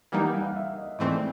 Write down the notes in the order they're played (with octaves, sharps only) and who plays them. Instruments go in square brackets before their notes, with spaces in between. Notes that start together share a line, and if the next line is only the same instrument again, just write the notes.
[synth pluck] E3 G3 A#3 D#4 [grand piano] F#5
[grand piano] F#5
F5
F5
E5
D#5
[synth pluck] G#2 E3 A3 C4 [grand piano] D5